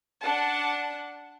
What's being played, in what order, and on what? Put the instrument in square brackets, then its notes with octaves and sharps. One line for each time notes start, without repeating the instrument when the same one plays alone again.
[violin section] D4 F#5 A5